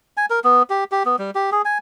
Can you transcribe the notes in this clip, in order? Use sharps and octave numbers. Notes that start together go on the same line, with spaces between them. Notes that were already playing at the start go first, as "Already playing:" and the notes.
G#5
A#4
B3
G4
G4
B3
G3
G4
G#4
G#5